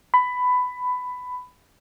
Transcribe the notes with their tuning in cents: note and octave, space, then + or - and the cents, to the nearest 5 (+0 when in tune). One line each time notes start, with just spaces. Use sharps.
B5 +15